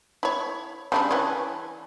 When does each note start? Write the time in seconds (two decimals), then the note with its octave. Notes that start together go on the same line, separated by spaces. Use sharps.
0.23 E4 C#5
0.92 C#3 G3 D4
1.11 E3 C#4